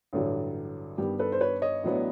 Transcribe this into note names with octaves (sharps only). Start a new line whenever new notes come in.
A1 G2 D3 F#3
G2 D#3 G3 B3 D4 G4
A4 B4
C5
B4 C#5
C#5 D#5
A1 A2 F#3 B3 D4